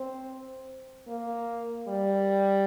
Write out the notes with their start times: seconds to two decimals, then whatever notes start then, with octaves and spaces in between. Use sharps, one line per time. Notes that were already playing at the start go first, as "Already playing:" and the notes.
Already playing: C4
1.07 A#3
1.88 G3